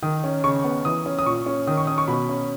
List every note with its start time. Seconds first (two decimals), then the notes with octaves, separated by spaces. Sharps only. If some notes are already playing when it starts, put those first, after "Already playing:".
0.03 D#3 D#6
0.24 C#4
0.44 C#3 C#6
0.64 B3
0.85 E3 D#6
1.06 C#4
1.19 D#6
1.26 A#2 C#6
1.46 C#4
1.67 D#3 D#6
1.77 C#6
1.87 C#4 D#6
1.98 C#6
2.08 B2 B5
2.29 C#4